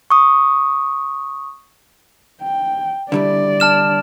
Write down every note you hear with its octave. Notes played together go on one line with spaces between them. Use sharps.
C#6 D#6
G5
D3 G3 E4 D5
A5 F6 E7